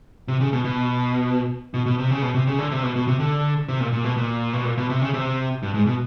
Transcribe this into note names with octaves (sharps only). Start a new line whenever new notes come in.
C3
C#3
B2
B2
B2
B2
C3
C#3
B2
C3
C#3
D3
C3
B2
B2
C3
D3
C3
A#2
A#2
B2
A#2
B2
A#2
B2
C3
C#3
C3
G2
G#2
B2